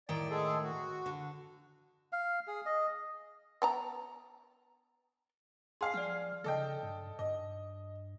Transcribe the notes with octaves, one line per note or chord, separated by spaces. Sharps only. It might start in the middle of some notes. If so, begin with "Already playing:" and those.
A2 D#3 D5 G5
G#3 G#4 A4
F#4
D3
F5
G#4
D#5
B3 A5 A#5
G#4 F5 C6 C7
F3 D5 F6
C#3 A4 D#5 G5
G2
G2 D#5